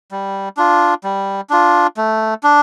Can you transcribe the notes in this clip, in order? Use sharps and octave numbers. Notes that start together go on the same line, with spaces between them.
G3
D4 F4
G3
D4 F4
A3
D4